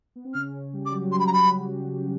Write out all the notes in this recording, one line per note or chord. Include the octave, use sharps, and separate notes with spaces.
B3
C4
C#3 C#4 F6
G3 G4
D6
F#3 F#4
G3 G4 C6
B5
A#5
F#3 F#4 B5